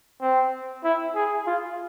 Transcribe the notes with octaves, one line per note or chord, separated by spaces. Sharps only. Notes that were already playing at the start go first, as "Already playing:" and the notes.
C4
E4
G#4
F4